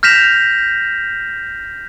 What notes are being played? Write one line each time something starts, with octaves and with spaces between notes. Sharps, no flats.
F6 G6 A#6 B6 E7 F7